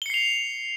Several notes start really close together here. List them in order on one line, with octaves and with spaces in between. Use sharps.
G7 C#7 C7 F7